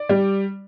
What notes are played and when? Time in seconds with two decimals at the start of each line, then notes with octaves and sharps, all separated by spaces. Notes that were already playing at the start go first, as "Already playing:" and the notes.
Already playing: D5
0.09 G3